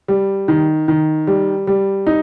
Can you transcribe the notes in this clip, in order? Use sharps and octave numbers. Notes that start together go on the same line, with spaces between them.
G3
D#3
D#3
G3
G3
D#4